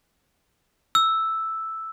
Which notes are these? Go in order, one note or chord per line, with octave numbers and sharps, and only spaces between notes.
E6